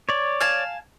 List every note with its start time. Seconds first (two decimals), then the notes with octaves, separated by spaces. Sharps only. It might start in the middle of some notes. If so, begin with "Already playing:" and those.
0.09 C#5 D5
0.40 F5 G#5 A5